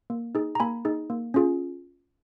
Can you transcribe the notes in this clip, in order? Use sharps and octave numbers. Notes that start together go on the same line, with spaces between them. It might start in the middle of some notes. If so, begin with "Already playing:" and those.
A#3
D#4 G#4
A#5
A#3 G#5 B5
D#4 G#4
A#3
C#4 F4 G#4